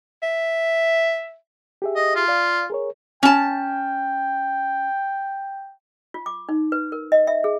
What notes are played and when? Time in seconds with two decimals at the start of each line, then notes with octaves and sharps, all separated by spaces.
0.23 E5
1.82 G4 G#4 E5
1.96 D#5
2.15 F4
2.28 D5 F5
2.70 G#4 A#4 C#5
3.23 C#4 G5 A5
6.14 F4
6.26 D6
6.49 D#4
6.72 B4
6.92 A#4
7.12 D#5
7.27 E5
7.44 G#4